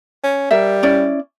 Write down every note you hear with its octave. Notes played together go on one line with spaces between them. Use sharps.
C#4
G3 A#4 E5
C#4 E4 D5